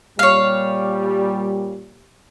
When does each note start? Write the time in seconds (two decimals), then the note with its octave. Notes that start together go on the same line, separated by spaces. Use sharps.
0.19 A#2 G3 C#5 F5